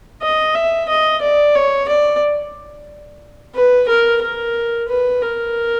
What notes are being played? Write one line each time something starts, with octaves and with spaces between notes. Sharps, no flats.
D#5
E5
D#5
D5
C#5
D5
B4
A#4
A#4
B4
A#4